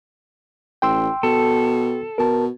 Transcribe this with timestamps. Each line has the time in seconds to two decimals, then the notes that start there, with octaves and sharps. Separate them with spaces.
0.82 A1 G5 C6 E6
1.23 B2 A4
2.18 B2 A#4 A5